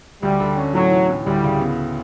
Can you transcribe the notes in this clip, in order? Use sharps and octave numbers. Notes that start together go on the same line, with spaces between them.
D2 G3
D3
C#4
A2 F#3
E3
A2
D2 G3
C#3
B3